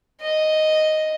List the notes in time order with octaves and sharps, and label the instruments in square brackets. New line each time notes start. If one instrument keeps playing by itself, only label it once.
[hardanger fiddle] D#5